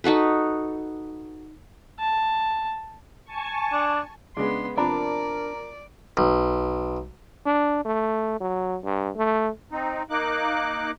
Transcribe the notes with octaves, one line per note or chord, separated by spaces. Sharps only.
D#4 F#4 A4 B4
A5
G#5 A5 C#6
D4
C#3 G#3 B3 D4 C6
C3 F3 D4 A#4 D5 A#5 B5
B1
D4
A3
F#3
G2
A3
C4 D#4
A#3 D#4 D6 F#6